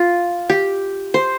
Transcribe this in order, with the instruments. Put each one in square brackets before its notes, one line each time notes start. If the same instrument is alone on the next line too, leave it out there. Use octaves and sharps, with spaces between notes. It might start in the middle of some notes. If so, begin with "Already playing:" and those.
Already playing: [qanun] F4
G4
C5